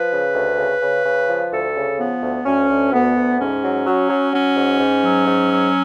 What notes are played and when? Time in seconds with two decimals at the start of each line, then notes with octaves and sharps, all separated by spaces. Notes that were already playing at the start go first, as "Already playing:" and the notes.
Already playing: F3 B4
0.12 C#3
0.35 D2
0.58 C#3
0.82 C#3
1.05 C#3
1.29 F3
1.52 D2 A4
1.76 C#3
1.99 F3 B3
2.23 D2
2.45 D2 C#4
2.68 D2
2.92 D2 B3
3.16 D2
3.39 G#2 C#4
3.63 F#3
3.87 F#3
4.10 F#3
4.33 F#3 C#4
4.57 G#2
4.80 G#2
5.03 F#3
5.27 G#2
5.51 F#3